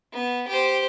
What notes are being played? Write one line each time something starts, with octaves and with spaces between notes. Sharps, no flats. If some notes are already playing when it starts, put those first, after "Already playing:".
B3
G4 C5